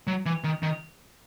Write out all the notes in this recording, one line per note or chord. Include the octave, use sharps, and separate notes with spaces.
F#3
E3
D#3
D#3